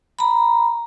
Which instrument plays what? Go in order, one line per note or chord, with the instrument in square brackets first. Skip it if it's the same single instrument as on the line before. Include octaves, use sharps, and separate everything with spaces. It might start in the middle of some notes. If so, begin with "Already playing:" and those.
[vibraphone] A#5 B5